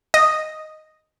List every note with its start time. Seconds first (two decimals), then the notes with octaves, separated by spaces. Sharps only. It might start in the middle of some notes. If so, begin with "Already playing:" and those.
0.14 D#5